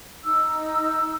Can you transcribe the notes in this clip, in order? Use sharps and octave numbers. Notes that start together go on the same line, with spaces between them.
D#4 E6